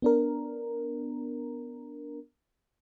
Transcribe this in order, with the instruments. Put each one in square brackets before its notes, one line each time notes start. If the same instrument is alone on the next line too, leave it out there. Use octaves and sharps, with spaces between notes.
[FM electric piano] B3 D4 A#4